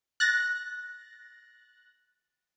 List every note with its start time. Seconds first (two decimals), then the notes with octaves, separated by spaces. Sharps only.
0.20 F#6 A6 A#6